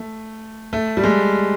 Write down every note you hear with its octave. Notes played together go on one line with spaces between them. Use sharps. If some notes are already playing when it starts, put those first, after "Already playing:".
Already playing: A3
A3
G3
G#3